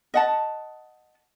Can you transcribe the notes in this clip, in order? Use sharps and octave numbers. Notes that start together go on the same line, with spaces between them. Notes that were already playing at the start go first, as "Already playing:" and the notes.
D#5 F#5 A5